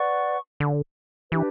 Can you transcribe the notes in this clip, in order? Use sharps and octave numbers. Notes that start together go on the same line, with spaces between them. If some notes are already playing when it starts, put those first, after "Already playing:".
Already playing: B4 D5 F#5 C#6
D3
E3 D4 G4 B4